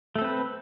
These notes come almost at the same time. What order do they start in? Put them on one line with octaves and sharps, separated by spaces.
A3 A4 C4 B4